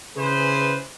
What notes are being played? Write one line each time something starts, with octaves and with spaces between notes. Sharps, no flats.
C#3 E3 G#4 B4 C5